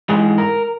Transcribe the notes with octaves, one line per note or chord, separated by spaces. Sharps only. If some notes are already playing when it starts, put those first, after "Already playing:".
G#2 E3 G#3 G#4
A#4